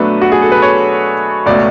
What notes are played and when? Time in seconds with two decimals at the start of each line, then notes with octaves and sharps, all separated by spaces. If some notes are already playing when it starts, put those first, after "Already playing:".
Already playing: B2 F#3 A3 D4 B4
0.22 F#4
0.32 G#4
0.42 A4
0.52 B4
0.62 C#5
1.46 C#2 B2 A3 C#4 D5